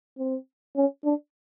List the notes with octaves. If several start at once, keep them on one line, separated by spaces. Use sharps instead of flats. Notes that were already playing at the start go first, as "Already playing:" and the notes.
C4
C#4
D4